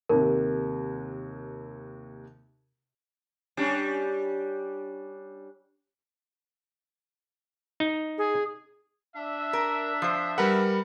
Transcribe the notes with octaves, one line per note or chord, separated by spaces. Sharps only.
D#2 C3 A#4
G3 C#4 D4
D#4
G#4
D4 E5
A#4
F3 C5
G3 A#4 B4 F#5